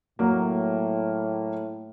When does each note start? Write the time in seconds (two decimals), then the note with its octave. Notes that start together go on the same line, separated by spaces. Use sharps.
0.19 A2 F#3 A#3